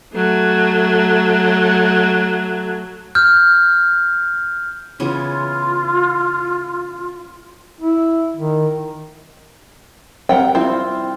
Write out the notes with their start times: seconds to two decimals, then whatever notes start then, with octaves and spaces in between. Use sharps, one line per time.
0.13 F#3 A3
3.15 F6 G6
5.00 C#3 E3 B3 F4
7.81 E4
8.37 D#3
10.29 G3 C4 A#4 F#5 G5
10.55 C4 E4 F4